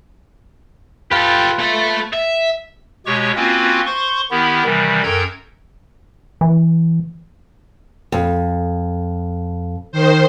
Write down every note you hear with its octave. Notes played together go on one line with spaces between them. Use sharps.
F4 G4 A4 B4
A3 E5
E5
B2 G#3 G4 C#5 C#6
A#3 C4 C#4 F4 F#4 B4
C5 C6 C#6
D#3 B3 E4 G4
C3 D#3 E3 G3
F#2 A4 A#4 G5 A#5 G#6
E3
F2
D#3 C5